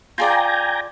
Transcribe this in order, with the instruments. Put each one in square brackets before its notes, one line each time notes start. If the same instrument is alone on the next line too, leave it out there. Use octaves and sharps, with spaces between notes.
[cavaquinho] F4 G#4 D5 [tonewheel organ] G5 G#5 A#5